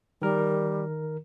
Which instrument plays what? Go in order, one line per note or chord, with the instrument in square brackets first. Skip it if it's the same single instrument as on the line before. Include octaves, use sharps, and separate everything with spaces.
[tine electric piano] D#3 A#4 [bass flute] G3